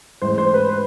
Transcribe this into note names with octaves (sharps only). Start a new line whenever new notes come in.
A1 G#2 G#3 C5
C5
B4
B4